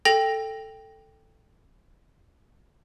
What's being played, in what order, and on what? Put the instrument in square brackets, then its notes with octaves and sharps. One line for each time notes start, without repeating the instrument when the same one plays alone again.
[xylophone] A4 G5 A#6 F7